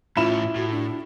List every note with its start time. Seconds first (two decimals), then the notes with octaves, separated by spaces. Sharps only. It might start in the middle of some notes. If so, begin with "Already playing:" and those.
0.17 A2 C#4 E4 F4 B5 E7
0.56 A2 F#4
0.71 D4